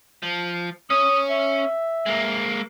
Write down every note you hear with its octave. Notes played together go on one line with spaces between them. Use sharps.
F3
C#4 C#5 D#6
E5
G#3 A#3